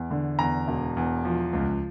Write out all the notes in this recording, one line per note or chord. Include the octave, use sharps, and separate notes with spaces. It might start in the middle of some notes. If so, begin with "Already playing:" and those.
Already playing: E2
D3
E2 A#5
E1
E2
F3
C#2